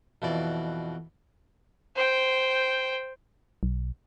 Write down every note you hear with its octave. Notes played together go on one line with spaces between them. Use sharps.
F2 B2 E3 D5
C5 G5
B1